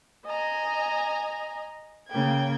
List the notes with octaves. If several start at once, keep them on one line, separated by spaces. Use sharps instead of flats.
D#5 G#5 A#5
C#3 A#3 G5 G#6